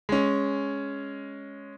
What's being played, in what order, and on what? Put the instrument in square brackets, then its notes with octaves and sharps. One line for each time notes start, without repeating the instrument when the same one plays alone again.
[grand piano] G#3 C#4